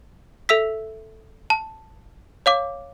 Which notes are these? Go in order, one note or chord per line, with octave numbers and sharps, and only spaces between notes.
A4 E5 E6 B6
A5
C#5 F5 D6